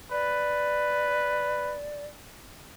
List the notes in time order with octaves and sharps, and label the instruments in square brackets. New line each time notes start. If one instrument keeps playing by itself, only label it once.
[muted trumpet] B4 [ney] D5